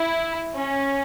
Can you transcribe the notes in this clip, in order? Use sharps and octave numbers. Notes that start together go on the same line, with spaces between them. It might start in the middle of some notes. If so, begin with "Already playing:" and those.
Already playing: E4
C#4